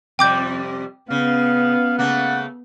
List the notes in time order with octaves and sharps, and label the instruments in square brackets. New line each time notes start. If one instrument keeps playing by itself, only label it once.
[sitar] F2 C3 G3 [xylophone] G5 D6 G6
[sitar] C#3 [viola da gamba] B3 [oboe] F5
[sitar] C#3 A3 A#3 [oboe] F#5